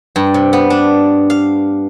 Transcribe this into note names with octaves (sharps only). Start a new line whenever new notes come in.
G2
C3
B3
D4
F5